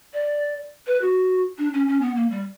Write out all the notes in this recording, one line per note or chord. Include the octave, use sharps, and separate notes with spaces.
D5
B4
F#4
D4
C#4
C#4
B3
A#3
G3